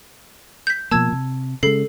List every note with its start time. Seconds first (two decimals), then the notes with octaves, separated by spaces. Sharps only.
0.67 G6 B6
0.91 B2 F3 A#3 A5 E6 G#6
1.12 C3
1.63 C#3 G#3 A4 C7